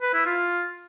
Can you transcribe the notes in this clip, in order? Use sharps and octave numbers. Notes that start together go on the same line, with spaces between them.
B4
E4
F4